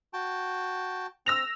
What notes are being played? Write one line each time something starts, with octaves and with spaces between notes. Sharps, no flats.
F#4 G5 A5
C4 E6 A#6 F7